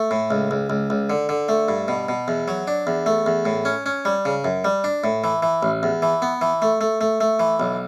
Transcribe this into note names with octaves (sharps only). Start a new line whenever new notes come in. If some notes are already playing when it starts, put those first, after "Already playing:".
Already playing: A3
A2
C#2
C#2
C#2
C#2
D3
D3
A3
G2
B2
B2
E2
F#3
D4
E2
A3
E2
A2
C#4
C#4
G3
C#3
F#2
G3
D4
A2
E3
E3
A1
E2
E3
B3
E3
A3
A3
A3
A3
E3
B1